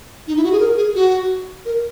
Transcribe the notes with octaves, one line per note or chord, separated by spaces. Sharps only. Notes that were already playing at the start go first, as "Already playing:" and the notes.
D#4
E4
F#4
G#4
A#4
G#4
F#4
A#4